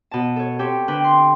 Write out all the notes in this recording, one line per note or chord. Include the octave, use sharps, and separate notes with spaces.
B2 A5
A4 C#5
C4 G4 A4 C#5
D3 D4 B4 G5
C6